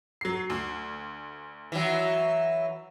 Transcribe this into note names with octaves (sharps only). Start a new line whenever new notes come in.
F#3 C7
D2
E3 F#3